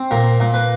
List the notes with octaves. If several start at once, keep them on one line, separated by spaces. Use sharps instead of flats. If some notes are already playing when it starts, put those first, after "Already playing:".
Already playing: C4
A#2 A#4
A#2
B4